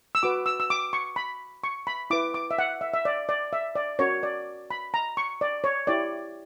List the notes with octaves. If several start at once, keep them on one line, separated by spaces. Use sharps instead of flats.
E6
F#4 B4 D6
E6
E6
D6
C#6
B5
C#6
B5
E4 B4 D6
D6
E5
F#5
E5
E5
D5
D5
E5
D5
C#4 F#4 A#4 C#5
D5
B5
A#5
C#6
D5
C#5
E4 G4 C#5 D5